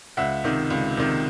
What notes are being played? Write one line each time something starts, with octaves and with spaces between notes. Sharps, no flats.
C#2 E5 F#5
C3 D#3
C#2
C3 D#3